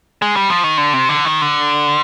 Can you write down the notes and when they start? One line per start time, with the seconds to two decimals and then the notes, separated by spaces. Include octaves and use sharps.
0.22 G#3
0.36 G3
0.50 F3
0.64 D#3
0.77 D3
0.94 C3
1.09 D3
1.25 D#3
1.41 D3